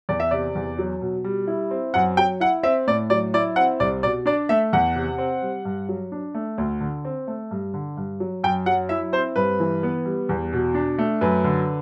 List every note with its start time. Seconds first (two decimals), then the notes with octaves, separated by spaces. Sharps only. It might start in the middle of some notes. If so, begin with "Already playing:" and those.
0.09 E2 D5
0.20 E5
0.31 C3 D5
0.55 E2
0.78 F#3
1.01 B2
1.24 G3
1.47 E4
1.71 C4
1.94 F#2 F#5
2.17 F#3 G5
2.40 E4 F#5
2.63 C4 E5
2.87 A2 D5
3.10 F#3 D5
3.34 E4 D5
3.56 C4 F#5
3.80 C2 D5
4.03 B2 D5
4.26 D4 D5
4.49 A3 E5
4.73 E2 F#5
4.96 C3
5.18 C4
5.42 G3
5.65 G2
5.89 F#3
6.12 D4
6.35 A3
6.58 D2
6.81 D3
7.05 C4
7.27 A3
7.51 G2
7.74 D3
7.97 G2
8.20 F#3
8.44 F#2 G5
8.66 F#3 F#5
8.89 E4 E5
9.13 C4 C5
9.36 G2 B4
9.60 E3
9.83 B3
10.05 G3
10.29 E2
10.53 B2
10.75 D4
10.99 A3
11.21 F#2 B4
11.44 D3